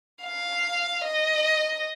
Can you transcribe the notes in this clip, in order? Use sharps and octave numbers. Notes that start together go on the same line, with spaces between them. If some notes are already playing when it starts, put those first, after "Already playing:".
F5
D#5